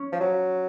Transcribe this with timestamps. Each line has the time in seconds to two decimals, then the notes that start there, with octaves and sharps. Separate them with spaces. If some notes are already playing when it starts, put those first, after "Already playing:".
Already playing: C#4
0.12 F3
0.20 F#3